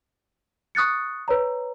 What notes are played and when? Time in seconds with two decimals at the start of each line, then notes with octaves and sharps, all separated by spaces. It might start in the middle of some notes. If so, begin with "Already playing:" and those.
0.75 C#6 D#6 F#6 A6 C#7
1.28 B4 C#5 A#5